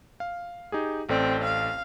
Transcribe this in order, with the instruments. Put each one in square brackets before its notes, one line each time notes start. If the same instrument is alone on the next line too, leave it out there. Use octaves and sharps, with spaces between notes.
[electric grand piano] F5
D#4 G4 G#4
[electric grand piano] A1 A4 D5 [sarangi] C4
[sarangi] F5